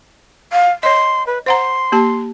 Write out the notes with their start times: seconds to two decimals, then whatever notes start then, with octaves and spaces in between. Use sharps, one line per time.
0.52 F5
0.83 C#5 D#5 C6
1.27 B4
1.46 C5 F#5 A#5 C6
1.92 A#3 G4 A5